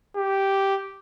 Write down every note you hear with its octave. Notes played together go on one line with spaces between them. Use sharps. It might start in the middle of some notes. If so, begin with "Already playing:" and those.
G4